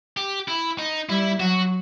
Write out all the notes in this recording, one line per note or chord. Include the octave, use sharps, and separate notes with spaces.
G4
E4
D#4
G3 E4
F#3 F#4